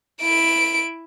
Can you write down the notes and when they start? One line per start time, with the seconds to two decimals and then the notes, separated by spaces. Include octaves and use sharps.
0.22 E4 D7